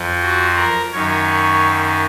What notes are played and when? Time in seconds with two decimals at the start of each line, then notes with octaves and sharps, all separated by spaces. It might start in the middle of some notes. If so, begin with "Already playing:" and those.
Already playing: F2 F3
0.22 F#4
0.57 A#4
0.92 F#2 D#3 C#5